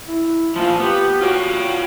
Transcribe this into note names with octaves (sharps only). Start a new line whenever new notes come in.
E4
A#2 F3 F4
B3 G4
F4 F#4 C#5 G5